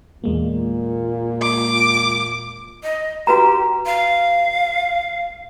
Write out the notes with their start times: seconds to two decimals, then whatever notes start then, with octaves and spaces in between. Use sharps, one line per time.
0.24 E2 A#2 G#3 A#3
1.42 D6
2.83 D#5
3.27 F#4 G4 B4 A#5
3.86 F5